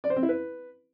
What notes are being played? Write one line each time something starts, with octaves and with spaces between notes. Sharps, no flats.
D5
C5
C4
E4
B4